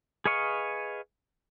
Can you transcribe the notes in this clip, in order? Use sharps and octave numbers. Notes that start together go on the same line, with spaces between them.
G#4 B4 D#5 F5 C#6